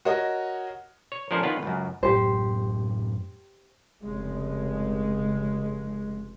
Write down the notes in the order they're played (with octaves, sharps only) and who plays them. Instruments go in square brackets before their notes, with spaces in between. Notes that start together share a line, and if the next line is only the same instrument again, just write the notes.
[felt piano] F#4 A#4 C#5 D#5
[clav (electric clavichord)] C#5
F3 A3 C#4 D4 A#4 C5
D#3 B3 C#4 F4 B4
C#2 F#2
[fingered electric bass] F#2 A2 [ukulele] G4 C5
[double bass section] F1 C#3 G#3